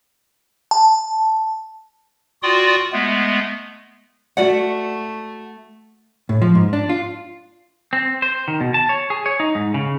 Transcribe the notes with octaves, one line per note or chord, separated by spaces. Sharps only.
A5
F4 F#4 D5 G5 C6 D#6
G#3 A3 B3
A3 F#4 D5 F#5
A2
F3
G#2
D4
F4
C4
C5
D#3
B2
A5
C#5
G#4
C#5
D#4
G#2
C#3